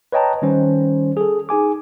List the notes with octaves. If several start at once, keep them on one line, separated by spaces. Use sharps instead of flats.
B4 C#5 D#5 G5 A5 A#5
D#3 G3 C#4 C5
G#4 A4
D#4 G#4 G#5 D6